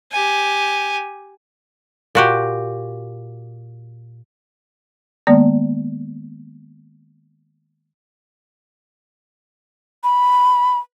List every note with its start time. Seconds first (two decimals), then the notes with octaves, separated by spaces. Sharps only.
0.12 G4 G#5
2.15 A#2 F#4 G4
5.27 D#3 G#3 A#3 B3 D5
10.04 B5